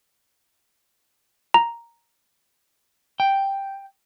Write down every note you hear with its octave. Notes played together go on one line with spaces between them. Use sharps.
A#5
G5